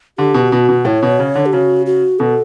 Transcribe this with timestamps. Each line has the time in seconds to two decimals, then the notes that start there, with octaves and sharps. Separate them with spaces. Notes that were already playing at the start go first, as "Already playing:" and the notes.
0.18 D3 G4
0.34 B2
0.52 B2 F#4
0.69 B2
0.85 A2 C#5
1.02 B2
1.19 C#3
1.35 D3
1.46 G4
1.53 C#3 F#4
1.86 F#4
2.19 B2 A4